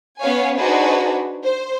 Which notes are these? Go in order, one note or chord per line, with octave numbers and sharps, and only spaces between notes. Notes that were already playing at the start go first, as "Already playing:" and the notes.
B3 C#4 C#5 F5 G#5
D4 D#4 F#4 G#4 B4 C5
C5